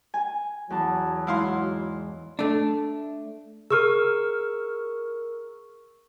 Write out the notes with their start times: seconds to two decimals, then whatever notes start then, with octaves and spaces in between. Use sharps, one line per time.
0.14 G#5
0.70 E2 F#3 A5
1.27 G#2 E4 F5 C6
2.39 A3 D4
3.70 G#4 A#4 C#6 E6 F6